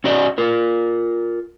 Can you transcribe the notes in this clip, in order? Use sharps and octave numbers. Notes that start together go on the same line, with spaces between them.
C#4 F#4 D5 D#5
F4 A#4